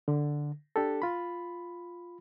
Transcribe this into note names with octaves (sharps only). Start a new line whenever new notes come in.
D3
D4 G4 A4
F4 B5